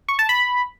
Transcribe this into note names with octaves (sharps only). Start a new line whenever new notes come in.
C#6
A5
B5